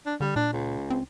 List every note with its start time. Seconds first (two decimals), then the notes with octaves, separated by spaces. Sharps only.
0.06 D4
0.20 D3 G3
0.36 A#2 D4
0.53 C#2
0.90 C4